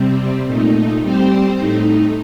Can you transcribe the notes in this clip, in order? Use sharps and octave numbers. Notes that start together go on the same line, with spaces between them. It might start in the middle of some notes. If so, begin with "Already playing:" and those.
Already playing: C3 G3 C4
A#2 A3 D#4
G3 C4 G4 C5
A2 A3 D#4